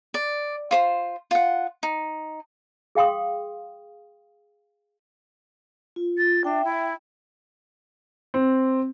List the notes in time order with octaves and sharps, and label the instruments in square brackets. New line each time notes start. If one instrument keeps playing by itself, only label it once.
[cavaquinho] D5
F4 C5 C6
F4 F#5
D#4
[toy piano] G#4 F5 G5 C6 D#6
[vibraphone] F4
[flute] A6
[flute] D4 [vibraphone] E5 G5
[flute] E4
[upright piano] C4